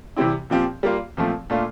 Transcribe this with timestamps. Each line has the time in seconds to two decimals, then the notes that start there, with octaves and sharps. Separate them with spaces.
0.16 C3 E3 G3 C4 E4
0.50 A#2 F3 C4 G4
0.83 G3 A#3 F4
1.17 A#2 F3 A3 C4
1.50 A#2 A3 D4 F4